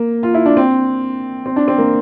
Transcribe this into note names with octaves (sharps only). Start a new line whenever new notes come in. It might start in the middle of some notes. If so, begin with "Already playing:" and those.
Already playing: A#3
F4
E4
D4
C4
C4
D4
C4
A#3